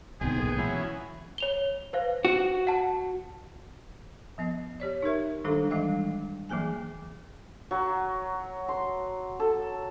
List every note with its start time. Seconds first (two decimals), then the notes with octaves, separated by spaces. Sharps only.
0.21 C2 G#2 D#3 B3 G#4 G5 G#5
0.36 B1 A#2
0.58 E3 F#3 C#4 E4
1.38 C#5 F7 G7
1.93 B4 C5 F5
2.25 F#4
2.67 F#5 A5
4.38 F3 B3 D#5
4.80 G4 C#5 D5
5.02 D#4 G4 A#4 E5
5.44 D#3 G3 G#3 D4 A4 A#5
5.71 E3 G3 G#3 D#5 G5
6.49 E3 F#3 A#3 G#4 G#5
7.71 F#3
8.69 C6
9.40 A4